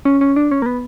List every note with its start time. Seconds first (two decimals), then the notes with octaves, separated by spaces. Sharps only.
0.05 C#4
0.21 C#4
0.36 D4
0.51 C#4
0.62 A#3
0.66 B3